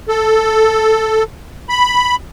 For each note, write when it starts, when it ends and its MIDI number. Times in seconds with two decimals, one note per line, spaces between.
0.09 1.24 69
1.69 2.16 83